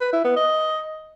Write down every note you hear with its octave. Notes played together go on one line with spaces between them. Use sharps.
B4
E4
B3
D#5